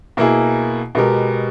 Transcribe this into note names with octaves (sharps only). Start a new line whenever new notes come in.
B2 A#3 E4 G#4
B2 G#3 B3 G4 A#4